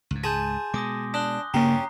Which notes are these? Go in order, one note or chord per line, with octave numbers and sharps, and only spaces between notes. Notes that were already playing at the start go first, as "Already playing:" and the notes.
C#2 G#2
G#4 G#5 A5 C6 G6
B2 G#3 D6 D#6 A#6
D4 D#6 F#6 G7
G2 C#3 A#3 C#4 G4 A#5 C7